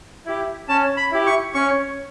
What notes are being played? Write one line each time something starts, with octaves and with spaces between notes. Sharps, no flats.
E4 G4
C#4 A5
B5
E4 G4
C#6
C#4 C#6